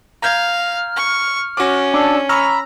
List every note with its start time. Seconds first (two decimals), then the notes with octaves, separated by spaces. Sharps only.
0.22 F5 A#5 F6 G6 G#6
0.96 C#6
1.57 C#4 F#4 D6
1.94 D4 E6
2.29 A#5 B5 C#6 E6 F6